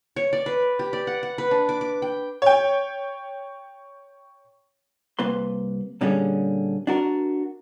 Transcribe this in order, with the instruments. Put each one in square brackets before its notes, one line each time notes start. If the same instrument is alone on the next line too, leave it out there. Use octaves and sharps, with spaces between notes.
[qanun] C#5
D5
B4
G4
D5
F#5
F#5
B4
D4
D6
D6
G5
[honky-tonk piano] C#5 G5
[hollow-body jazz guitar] C2 A#3 B4 C6
A#2 D3 G3 A#3 C#4 G#4
D4 F#4 A#4